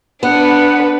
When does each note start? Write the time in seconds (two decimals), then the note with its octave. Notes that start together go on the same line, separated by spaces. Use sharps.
0.23 B3 D4 B4 F#5